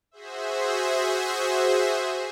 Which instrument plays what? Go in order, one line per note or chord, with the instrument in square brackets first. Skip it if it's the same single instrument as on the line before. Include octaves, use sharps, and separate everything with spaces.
[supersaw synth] F#4 G#4 C5 E5